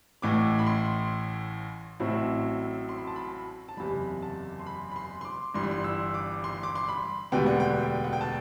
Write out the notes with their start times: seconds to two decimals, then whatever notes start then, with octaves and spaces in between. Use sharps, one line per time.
0.22 A1 A2 E3 D6
0.59 B5
0.67 C6
2.00 A1 A2 F#3 C4 E4
2.89 C6
2.98 B5
3.07 A5
3.16 B5
3.69 A5
3.77 F#1 E2 C3 B5
4.22 A5
4.59 C6
4.66 B5
4.91 B5
4.96 C6
5.21 C6
5.25 D6
5.54 G1 G2 E3 C6
5.63 B5
5.71 C6
5.84 E6
6.14 D6
6.44 C6
6.63 D6
6.75 C6
6.88 B5
7.32 E1 D2 D3 G3 B3 G5
7.46 F#5
7.60 G5
8.04 F#5
8.13 G5
8.21 A5